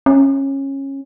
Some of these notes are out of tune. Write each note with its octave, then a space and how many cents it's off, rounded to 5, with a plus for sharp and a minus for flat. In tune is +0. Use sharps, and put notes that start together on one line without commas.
C#4 -20